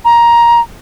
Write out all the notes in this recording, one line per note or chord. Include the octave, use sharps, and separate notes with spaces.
A#5